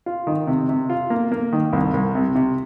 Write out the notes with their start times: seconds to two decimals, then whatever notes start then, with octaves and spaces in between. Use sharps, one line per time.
0.06 F4
0.27 D#3
0.47 C3
0.69 C3
0.90 F4
1.10 A#3
1.32 A#3
1.53 D#3
1.73 C2
1.94 C2
2.15 C3
2.35 C3